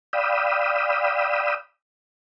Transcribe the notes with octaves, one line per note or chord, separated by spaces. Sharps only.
D5 F5 G5 B5 D#6 E6